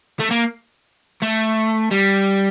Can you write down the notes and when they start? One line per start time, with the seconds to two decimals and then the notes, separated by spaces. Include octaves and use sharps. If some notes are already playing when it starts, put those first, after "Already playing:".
0.20 A3
0.31 A#3
1.22 A3
1.91 G3